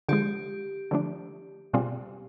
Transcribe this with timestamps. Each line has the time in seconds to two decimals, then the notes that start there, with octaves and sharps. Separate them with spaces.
0.09 D3 F3 G#3 G4
0.91 D3 F3 A3 D4
1.73 B2 G3 C4 F4 G#4